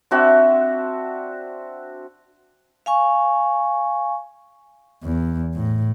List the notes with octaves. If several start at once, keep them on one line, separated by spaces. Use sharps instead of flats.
C4 D4 F#4 E5
F5 G#5 C#6
E2
A2